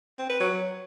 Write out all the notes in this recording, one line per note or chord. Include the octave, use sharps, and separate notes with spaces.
C4
B4
F#3